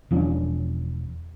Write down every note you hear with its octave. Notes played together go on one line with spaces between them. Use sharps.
E1 F3 C#4 D4